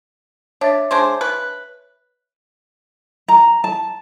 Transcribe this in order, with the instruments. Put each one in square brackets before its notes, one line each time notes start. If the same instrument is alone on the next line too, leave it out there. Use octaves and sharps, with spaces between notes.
[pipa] D4 [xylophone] C#5 E5 A6
[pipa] G#3 D4 C5
B4
[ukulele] A#5
A5